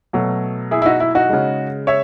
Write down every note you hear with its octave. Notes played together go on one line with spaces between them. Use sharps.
B2 F#3 A3
E4 G#4
E4
D#4 F#4
E4
D#4 F#4
C#3 G#3
C#5 E5